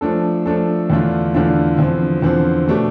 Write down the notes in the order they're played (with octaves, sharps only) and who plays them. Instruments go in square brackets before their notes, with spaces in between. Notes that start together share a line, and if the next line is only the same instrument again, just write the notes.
[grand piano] F3 A3 D4 A4
F3 A3 D4 A4
E2 D3 A3 D4 F4
E2 D3 A3 D4 F4
E2 D3 F3 C4
E2 D3 F3 C4
B2 A3 D4 G4